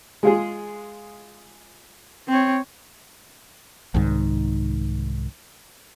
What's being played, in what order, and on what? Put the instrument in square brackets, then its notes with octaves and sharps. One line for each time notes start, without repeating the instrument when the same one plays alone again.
[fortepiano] G#3 F4 G#4
[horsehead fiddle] C4 C#5
[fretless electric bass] C2 G#2 D#3